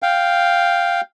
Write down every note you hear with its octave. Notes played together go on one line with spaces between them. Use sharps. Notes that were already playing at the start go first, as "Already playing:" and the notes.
F5 G5